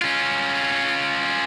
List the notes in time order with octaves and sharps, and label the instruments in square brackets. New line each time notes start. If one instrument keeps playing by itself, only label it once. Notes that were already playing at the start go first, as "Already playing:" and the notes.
[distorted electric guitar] C#4 F4